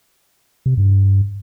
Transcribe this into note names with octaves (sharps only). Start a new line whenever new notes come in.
C3
G2